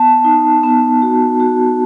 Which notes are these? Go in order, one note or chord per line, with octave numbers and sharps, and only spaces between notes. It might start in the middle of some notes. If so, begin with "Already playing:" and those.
Already playing: B3 A5
D#4
B3
F#4
F#4